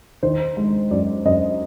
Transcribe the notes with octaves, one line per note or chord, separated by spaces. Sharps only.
D#3 C5
G#3
F#2 D5
F#2 D#5